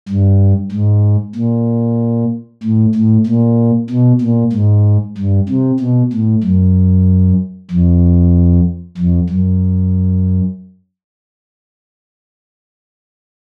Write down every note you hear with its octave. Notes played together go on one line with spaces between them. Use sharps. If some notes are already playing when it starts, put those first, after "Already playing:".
G2
G#2
A#2
A2
A2
A#2
B2
A#2
G#2
G2
C3
B2
A2
F#2
F2
F2
F#2